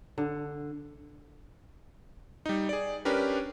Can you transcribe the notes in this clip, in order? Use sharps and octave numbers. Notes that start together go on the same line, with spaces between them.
D3
G3 D#4
G#4 D5
C#4 D4 G4 A#4 B4